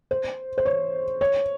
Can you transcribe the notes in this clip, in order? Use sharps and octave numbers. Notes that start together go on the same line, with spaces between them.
C5
C5
C#5
C#5